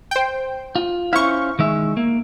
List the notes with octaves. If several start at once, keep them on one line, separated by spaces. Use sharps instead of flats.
C5 G5
F4
C#4 E4 C5 F5 C#6
D#3 G#3 E5
A#3